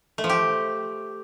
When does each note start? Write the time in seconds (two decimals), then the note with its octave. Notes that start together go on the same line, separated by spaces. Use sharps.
0.18 A3
0.24 F3
0.29 G4